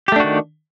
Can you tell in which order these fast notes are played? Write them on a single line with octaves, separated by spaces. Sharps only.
G4 A3 D4 F#4 D#3